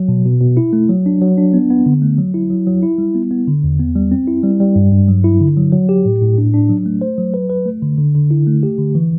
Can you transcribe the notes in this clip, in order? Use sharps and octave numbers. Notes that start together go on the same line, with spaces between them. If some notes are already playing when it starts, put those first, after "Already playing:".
Already playing: F#3
B2
B2
B2
E4
A3
F#3
D4
F#3
D4
B3
B3
D3
A3
F#3
E4
F#3
F#3
E4
G3
B3
B3
D3
E2
B3
G3
C4
E4
G3
G3
G2
G2
F#3
E4
D3
F#3
F#3
G4
A2
A2
D4
D4
F#3
A3
C5
F#3
B4
B4
A3
D3
D3
D3
E4
A3
G4
D3
E3